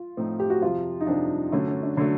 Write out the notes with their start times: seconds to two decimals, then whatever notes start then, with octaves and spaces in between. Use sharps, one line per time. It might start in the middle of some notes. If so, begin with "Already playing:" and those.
Already playing: F4
0.17 A2 F3 A3 C4 D#4
0.40 G4
0.50 F#4
0.62 F2 C3 F3 F4
1.01 D#4
1.07 F2 C3 F3 D4
1.52 D3 F#3 A3 C#4
1.68 C#4
1.83 D4
1.97 D3 F#3 A3 D4